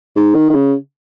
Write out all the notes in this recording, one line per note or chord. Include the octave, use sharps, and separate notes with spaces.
G#2
D#3
D#3
C#3